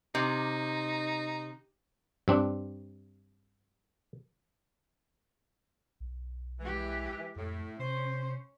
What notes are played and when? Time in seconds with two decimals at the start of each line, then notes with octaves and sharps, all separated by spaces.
0.15 C3 D#4
2.28 G2 C4 D4
6.00 B1
6.60 E3 G#3 G4
7.36 F2 A2 A3
7.79 C3 C#4 C5